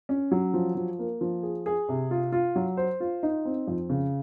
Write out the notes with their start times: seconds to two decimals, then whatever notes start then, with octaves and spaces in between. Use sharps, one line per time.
0.09 C#4
0.31 F#3
0.54 F3
0.75 F3
0.99 A#3
1.21 F3
1.43 G#4
1.66 G#4
1.89 C3
2.11 F4
2.32 F4
2.56 F#3
2.77 C5
3.00 F4
3.23 D#4
3.45 C4
3.68 F2
3.90 C#3